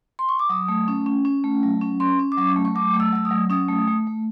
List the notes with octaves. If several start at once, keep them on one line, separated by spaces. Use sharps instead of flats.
C6
C#6
D6
F#3 D#6
A3
C#4
C#4
C#4
A3
F#3
C#4
C#4 C6
C#4
D6
F#3 C#6
A3
C#6
F#3 D6
A3
E6
F#3 E6
D#6
F#3
C#4 D#6
A3
A3
A3